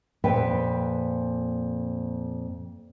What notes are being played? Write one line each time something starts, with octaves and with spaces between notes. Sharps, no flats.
F2 A#2 B4 G5